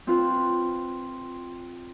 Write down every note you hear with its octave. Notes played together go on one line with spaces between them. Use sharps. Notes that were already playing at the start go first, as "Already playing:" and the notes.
C4 F4 B4